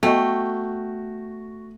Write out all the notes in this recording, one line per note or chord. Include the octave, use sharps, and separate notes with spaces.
A3 B3 F#4 D#5 G5